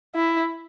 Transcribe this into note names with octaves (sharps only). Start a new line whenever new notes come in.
E4